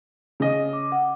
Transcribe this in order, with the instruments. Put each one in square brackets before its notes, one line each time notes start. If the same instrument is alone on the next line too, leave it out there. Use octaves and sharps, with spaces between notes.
[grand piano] C#3 D#5
[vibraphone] D6
F#5